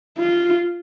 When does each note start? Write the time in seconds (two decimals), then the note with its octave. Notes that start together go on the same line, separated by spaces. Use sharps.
0.18 F4